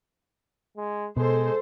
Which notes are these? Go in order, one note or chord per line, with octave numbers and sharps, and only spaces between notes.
G#3
B2 G#3 A4 C5